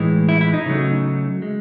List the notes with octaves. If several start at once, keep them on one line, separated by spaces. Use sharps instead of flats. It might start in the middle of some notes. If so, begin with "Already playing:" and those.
Already playing: A2 E3 G#3
E4
E4
D#4
C#3 F#3 A3
G#3